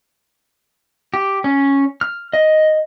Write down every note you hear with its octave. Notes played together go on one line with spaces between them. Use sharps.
G4
C#4
F6
D#5